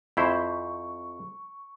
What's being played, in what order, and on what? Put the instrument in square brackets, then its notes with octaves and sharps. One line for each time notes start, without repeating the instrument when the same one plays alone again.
[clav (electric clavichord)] F2 E4 C5 [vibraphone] C#6